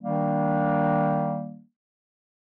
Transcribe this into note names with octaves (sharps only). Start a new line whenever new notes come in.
D#3 G3 A#3 D4